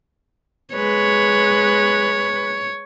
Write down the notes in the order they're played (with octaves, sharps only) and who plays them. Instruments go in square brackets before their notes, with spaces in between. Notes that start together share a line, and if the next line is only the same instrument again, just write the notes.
[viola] G#3 B4 [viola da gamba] C#5